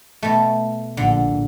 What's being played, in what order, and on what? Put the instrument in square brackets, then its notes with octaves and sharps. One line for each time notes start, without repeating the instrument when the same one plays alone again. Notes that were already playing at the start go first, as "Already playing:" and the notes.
[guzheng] B2 A3
[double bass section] A#1 [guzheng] D3